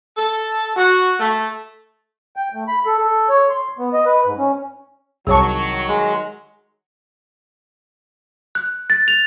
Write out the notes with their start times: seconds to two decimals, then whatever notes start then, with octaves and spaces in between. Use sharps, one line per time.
0.16 A4
0.75 F#4
1.19 A3
2.36 G5
2.53 A3
2.68 B5
2.86 A4
2.98 A4
3.29 C#5
3.49 C6
3.78 B3
3.93 D#5
4.06 B4
4.25 G#2
4.38 C#4
5.27 C2 D#3 F#3 G#4 C#5 A5 C#6
5.88 G#3
8.55 F#6
8.90 A6
9.08 F7